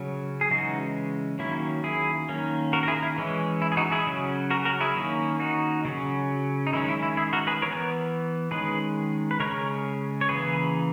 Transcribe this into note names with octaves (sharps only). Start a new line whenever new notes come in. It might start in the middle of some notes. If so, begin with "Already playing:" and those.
Already playing: C#3 F#3 C#4
G#4
C#3 E3 G#3 C#4 D#4 F#4
D#3 F#3 A#3 C#4 E4
E4 G#4
D#3 A#3 C#4
F#4 A#4
A#4
E4 G#4
E4
E3 G#3 C#4
E4
G#4
D#4 F#4
E4 G#4
C#3 F#3 C#4
F#4 A#4
F#4 A#4
E4 G#4
D#3 A#3 C#4
D#4 F#4
C#3 F#3 C#4
D#4
D#3 G#3 C#4 E4
E4
E4
E4 G#4
F#4 A#4
G#4 B4
E3 B3 A#4 C#5
D#3 G#3 C#4 G#4 B4
B4
C#3 G#3 C#4 A#4 C#5
C#5
C#3 E3 A#3 G#4 B4